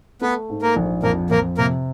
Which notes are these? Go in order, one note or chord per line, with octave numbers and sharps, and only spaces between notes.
A3 B3 B4
G#2
A#3 A#4
A#1
F2 A#3 A#4
F2 A#3 A#4
C3 A#3 A#4